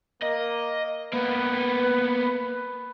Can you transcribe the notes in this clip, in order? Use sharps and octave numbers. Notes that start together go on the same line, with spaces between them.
A#3 D#5
A#3 B3 B4